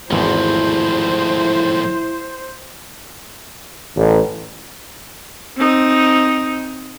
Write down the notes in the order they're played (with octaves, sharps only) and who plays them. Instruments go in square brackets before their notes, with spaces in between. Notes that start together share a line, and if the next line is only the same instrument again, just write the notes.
[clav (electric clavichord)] G#1 E2 [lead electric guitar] A2 F3 [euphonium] E4 [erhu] C5
[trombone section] A1
[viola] C4 D#4